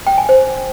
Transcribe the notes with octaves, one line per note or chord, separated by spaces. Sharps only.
G5
G#5
C5